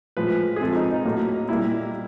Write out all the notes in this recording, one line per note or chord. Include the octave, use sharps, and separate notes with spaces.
A2 F3 G#3 B4
G#4
C3 F3 G#3 A4
D#4
D#4
A2 F#3 A#3
A#2 G3 A#3 E4